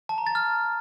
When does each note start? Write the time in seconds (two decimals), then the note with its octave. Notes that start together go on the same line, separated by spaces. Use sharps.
0.09 A5
0.18 A#5
0.27 A6
0.35 F6